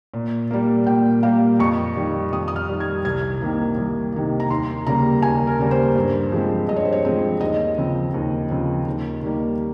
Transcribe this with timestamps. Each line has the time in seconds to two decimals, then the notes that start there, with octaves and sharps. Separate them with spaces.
0.14 A#2
0.51 G3 A#3
0.87 A#2 G5
1.23 G3 A#3 F5
1.59 F2 C#6
1.96 D#3 G3
2.32 F2 D#6
2.48 D#6
2.56 F6
2.68 D#3 G3
2.80 G#6
3.05 C2 G#6
3.41 C3 D#3 A#3
3.78 C2
4.13 C3 D#3 A#3
4.40 A#5
4.50 D#2 C6
4.86 C#3 G3 A#3 A#5
5.22 D#2 G#5
5.47 A#4
5.59 C#3 G3 A#3
5.71 C5
5.95 G2
6.32 F3 G#3 C4
6.68 G2 D#5
6.76 C#5
6.85 C5
6.92 C#5
7.05 F3 G#3 C4
7.41 D#2 D#5
7.77 C#3 F3 C4
8.14 D#2
8.50 C#3 F3 C4
8.87 D#2
9.23 D#3 G3 A#3